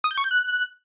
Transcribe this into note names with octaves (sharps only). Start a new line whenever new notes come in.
D#6
G6
C#6
G6
F#6